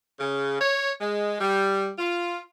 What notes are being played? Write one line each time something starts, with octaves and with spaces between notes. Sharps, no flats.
C#3
C#5
G#3
G3
F4